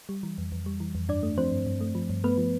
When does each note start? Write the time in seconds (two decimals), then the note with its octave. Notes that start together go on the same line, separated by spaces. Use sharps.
0.09 G3
0.23 E3
0.38 F2
0.52 F2
0.66 G3
0.80 E3
0.95 F2
1.09 G2 D4 D5
1.23 A3
1.38 F3 C4 C5
1.52 G2
1.67 G2
1.81 A3
1.95 F3
2.10 G2
2.24 A3 B3 B4
2.38 F3